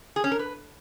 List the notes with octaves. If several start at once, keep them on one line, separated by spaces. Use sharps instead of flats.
G#4
C#4
A#4
B4